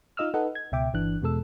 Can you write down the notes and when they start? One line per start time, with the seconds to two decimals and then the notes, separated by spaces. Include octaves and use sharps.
0.17 D#4 F4 D#5 E6 F6
0.34 D#4 A4 B4 D#5 F#5
0.55 G#6
0.72 C#2 B2 E5 G5 D6
0.93 G1 E3 D4 F#6
1.22 E2 B2 G#3 A4 E6